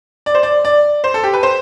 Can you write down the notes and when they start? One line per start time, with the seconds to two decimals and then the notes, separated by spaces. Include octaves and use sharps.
0.26 D5
0.35 C5
0.43 D5
0.65 D5
1.04 C5
1.14 A4
1.24 G4
1.33 B4
1.43 C5